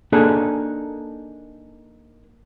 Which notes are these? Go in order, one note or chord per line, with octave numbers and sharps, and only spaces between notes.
A#3 D4 D#4 G#4 A4